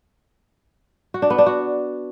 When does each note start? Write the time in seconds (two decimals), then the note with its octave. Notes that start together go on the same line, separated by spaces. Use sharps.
1.14 F#4
1.22 D4
1.30 B3
1.38 D4
1.46 F#4